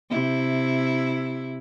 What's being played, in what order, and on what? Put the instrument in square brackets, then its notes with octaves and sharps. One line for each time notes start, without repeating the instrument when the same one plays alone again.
[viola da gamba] C3 E4